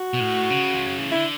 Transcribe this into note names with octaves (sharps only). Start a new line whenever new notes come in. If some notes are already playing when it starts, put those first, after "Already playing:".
Already playing: F#4
B2
A2
C#3
G#3
F#3
E3
D3 E4